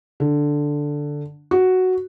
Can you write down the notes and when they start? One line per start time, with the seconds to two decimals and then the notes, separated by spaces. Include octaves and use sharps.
0.20 D3
1.51 F#4